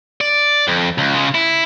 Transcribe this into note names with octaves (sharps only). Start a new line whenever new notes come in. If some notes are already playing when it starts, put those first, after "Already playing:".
D5
F2
C#2
C#3 G#3
E4